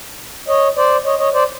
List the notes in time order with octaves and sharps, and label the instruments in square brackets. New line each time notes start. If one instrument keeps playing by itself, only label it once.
[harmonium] C#5 D#5
C5 D5
C#5 D#5
C#5 D#5
C5 D5